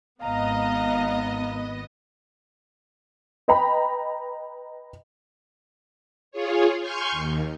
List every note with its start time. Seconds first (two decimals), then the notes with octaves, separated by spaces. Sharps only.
0.22 G#1 B3 D#5 F5 A#5
3.48 B4 D#5 G5 A#5 B5
6.32 F4 G#4 C#5
6.81 G#5 C6 C#6 F6 G6 G#6
7.12 D#2